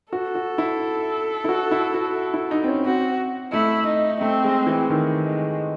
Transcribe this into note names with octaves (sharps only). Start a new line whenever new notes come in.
F#4 A4
F#4
E4
E4
F#4
E4
F#4
E4
D#4
C4
C#4
C4 F#4
A3 E4
D#4
A3 C4
G#3
E3
D#3
G#3